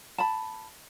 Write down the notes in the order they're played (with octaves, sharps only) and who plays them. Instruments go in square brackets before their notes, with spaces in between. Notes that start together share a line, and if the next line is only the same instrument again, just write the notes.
[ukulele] A5 B5